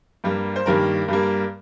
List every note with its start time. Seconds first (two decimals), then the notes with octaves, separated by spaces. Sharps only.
0.24 G2 G3 A#3
0.56 C5
0.66 G2 D#3 G3 A#3 A#4
1.08 G2 G3 A#3